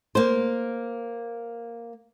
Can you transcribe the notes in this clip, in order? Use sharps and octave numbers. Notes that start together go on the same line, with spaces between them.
A#3 C5